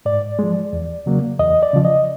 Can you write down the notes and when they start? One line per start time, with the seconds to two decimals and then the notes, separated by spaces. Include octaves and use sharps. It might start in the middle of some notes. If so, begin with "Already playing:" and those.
0.05 G#2 D5
0.39 F3 G#3
0.73 E2
1.06 C#3 F#3 A#3
1.39 E2 D#5
1.63 D5
1.73 C#3 F3
1.85 D#5